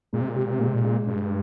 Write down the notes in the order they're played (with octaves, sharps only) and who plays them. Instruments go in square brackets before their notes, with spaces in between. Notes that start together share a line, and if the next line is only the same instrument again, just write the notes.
[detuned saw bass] A#2 [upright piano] G#3
[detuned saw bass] C3
A#2
[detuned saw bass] C3 [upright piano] G4
[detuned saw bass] A#2
C3
[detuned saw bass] A#2 [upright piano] G#3
[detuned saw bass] C3
A#2
[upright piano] G#3
[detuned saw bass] G2 [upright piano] G#3